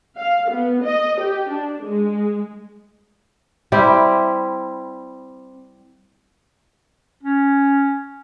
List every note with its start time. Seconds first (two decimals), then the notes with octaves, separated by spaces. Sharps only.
0.17 F5
0.50 B3
0.83 D#5
1.20 G4
1.50 D4
1.85 G#3
3.72 G3 C4 E4
7.23 C#4